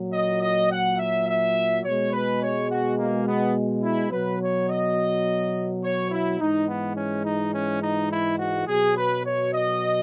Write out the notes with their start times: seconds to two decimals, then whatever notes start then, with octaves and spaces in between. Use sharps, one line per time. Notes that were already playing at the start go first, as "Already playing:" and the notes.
Already playing: A#2 F#3
0.13 D#5
0.42 D#5
0.71 F#5
0.98 E5
1.28 E5
1.84 B2 G#3 C#5
2.13 B4
2.42 C#5
2.69 F#4
2.98 A#3
3.26 B3
3.83 E4
4.11 B2 F#3 B4
4.40 C#5
4.69 D#5
5.83 C#5
6.11 E4
6.40 G#2 E3 G#3 D#4
6.68 B3
6.96 C#4
7.25 D#4
7.53 C#4
7.83 D#4
8.11 E4
8.39 F#4
8.68 B2 F#3 G#4
8.97 B4
9.25 C#5
9.53 D#5